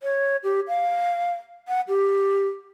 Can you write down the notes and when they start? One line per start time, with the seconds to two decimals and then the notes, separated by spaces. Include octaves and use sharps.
0.03 C#5
0.44 G4
0.68 F5
1.68 F#5
1.88 G4